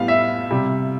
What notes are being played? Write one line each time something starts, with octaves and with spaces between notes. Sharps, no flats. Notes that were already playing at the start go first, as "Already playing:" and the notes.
Already playing: A2 G3 B3 F5
E5
C3 G3